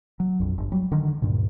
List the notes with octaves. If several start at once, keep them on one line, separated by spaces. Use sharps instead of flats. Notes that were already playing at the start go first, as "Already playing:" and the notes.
F#3
A#1 F2
G1
F#3 G3
D3 D#3
D2 G2 A#2